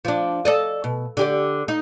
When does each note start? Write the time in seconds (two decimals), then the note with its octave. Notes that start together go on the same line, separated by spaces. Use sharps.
0.05 F3 D4
0.45 A4 D5 D#5
0.84 B2
1.17 D3 G4 D5
1.68 D#4